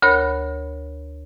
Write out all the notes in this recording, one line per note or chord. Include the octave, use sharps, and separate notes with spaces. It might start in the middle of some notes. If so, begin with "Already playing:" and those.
D2 A#4 C#5 B5 F#6